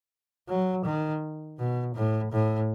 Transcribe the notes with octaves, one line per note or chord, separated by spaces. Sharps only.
F#3
D#3
B2
A2
A2